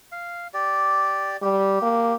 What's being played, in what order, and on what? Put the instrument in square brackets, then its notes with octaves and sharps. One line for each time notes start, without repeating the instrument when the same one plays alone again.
[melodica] F5
G4 D5
[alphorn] G3 [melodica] G4
[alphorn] A#3